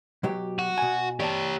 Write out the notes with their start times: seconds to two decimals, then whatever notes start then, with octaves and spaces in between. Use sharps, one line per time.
0.23 B2 F#3 G4
0.59 F#4
0.78 B2 G#5
1.20 G4 C#5 D5 A5